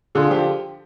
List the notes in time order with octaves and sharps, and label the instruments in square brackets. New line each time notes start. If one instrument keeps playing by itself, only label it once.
[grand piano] D3 F4 G#4
F3 G4